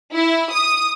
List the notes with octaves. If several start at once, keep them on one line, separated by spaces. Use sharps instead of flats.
E4
D#6